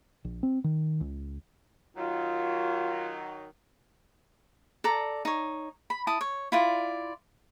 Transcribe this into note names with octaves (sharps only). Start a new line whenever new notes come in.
A#1
C4
D#3
C#2
D#3 F#3 F4
A4 D5 A#5
D#4 C#5
B5
E4 A5 D#6
C#5
E4 F4 D5